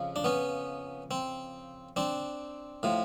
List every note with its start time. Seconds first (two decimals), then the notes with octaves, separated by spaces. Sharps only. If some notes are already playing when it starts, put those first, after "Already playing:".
Already playing: F2 C#3 F3
0.16 D4
0.24 B3 C#4
1.11 C4
1.96 C4 D4
2.83 A2 F3